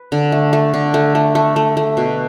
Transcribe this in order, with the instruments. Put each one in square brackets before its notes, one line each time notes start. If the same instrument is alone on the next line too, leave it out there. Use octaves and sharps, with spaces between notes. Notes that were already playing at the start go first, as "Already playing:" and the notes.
Already playing: [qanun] B4
D3
A3
A3
D3
A3
A3
A3
A3
A3
B2